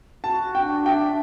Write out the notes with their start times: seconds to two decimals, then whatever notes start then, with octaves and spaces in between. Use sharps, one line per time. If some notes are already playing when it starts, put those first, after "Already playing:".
0.24 F#4 A5
0.55 D4 G5
0.86 E5 G5